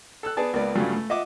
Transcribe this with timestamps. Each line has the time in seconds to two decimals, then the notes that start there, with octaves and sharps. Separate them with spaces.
0.23 A4 E6 F#6
0.37 B3 G#4 D5 A5
0.53 C#2 A#3 B3 D5
0.75 G2 C#3 F#3 G3 A3 F4
0.93 A3
1.09 F4 D#5 E5 F#5 D6